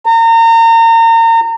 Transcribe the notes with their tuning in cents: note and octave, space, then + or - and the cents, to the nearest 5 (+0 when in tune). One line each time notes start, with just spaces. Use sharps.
A#5 -35